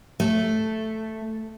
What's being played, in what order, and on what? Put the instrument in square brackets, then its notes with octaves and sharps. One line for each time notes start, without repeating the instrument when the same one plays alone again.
[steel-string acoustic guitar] A3